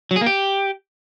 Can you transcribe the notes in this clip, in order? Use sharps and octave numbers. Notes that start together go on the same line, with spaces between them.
F#3
G#4
A#3
G4